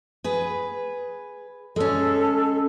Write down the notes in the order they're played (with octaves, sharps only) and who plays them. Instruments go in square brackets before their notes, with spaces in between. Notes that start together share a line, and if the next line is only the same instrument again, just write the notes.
[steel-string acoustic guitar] G#4 B4
[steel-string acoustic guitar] G#3 C#4 [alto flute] A4